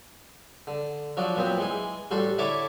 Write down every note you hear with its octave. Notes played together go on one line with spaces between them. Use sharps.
D3
F3 F#3 D4 F#4
A#2 F#3 B3 C4
E3 G#3 G#4
A1 G3 F#4 A4 C6
D3 E4 A4 C#5 E5 D6